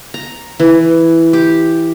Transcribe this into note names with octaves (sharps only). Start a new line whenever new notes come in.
A#5
E3
G4